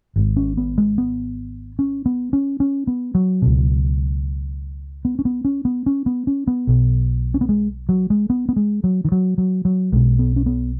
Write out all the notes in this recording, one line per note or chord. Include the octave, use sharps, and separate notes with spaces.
G#1 G#2
C#4
B3
G#3
B3
C#4
B3
C#4
C#4
B3
F#3
C#2 B2
B3
C#4
B3
C#4
B3
C#4
B3
C#4
B3
B1 B2
C#4
B3
G#3
F#3
G#3
B3
B3
G#3
F#3
D#3
F#3
F#3
F#3
B1 B2 G#3
B3
C#4
B3